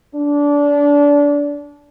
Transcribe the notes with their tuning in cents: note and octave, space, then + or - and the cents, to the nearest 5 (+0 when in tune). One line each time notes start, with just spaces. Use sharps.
D4 -25